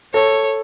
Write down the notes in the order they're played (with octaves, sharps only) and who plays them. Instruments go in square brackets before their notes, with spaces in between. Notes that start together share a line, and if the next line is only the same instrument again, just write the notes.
[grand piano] A4 [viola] C#5